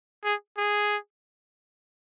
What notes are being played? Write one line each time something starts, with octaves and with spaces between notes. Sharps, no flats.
G#4
G#4